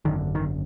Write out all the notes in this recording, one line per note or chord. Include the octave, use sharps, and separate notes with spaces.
G#1 F#2 D3 D#3
D#3